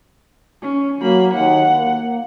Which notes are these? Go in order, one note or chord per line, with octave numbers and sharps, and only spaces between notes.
C#4
F#3 A#3 B5
D#2 F#5
A#3